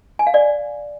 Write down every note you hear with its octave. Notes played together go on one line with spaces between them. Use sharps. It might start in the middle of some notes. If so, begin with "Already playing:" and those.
G#5
F5
D5